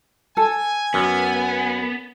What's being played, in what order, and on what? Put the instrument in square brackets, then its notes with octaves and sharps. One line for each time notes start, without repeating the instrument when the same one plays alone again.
[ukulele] A4 [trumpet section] G#5
[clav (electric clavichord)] F#2 [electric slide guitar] B3